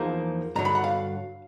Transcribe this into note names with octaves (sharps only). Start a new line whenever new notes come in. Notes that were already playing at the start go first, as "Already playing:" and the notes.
Already playing: E2 F3 A#3 D#4 C6
G2 D3 F#3 A#5
B5
F#5
F5